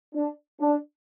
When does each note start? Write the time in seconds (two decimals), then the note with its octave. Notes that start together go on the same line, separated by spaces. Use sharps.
0.15 D4
0.60 D4